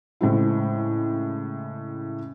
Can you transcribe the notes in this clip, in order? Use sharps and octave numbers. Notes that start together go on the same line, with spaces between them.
A2 C#3 G#3 C4 E4